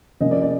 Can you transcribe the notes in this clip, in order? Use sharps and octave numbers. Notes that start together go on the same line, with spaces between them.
C3 F3 A#3 C#4 D#5
D5
D5